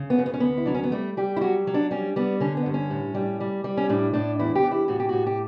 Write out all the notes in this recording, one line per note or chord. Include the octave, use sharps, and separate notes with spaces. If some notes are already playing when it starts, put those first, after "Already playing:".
Already playing: C#3
B3
F#2
B3
C#4
D2 B3
E4
F#3 D4
C#4
B3
G3 A3
G3 G4
E4
F#3 F#4
F#3
D4
G3 C#4
G3 B3
D3 C#4
B3
G2
C#4
A2
G3
G3
G3
C#4
A2 D4
A2 D4
E2 E4
G4
E2
E4
A2 F#4
G4
A2 F#4
G4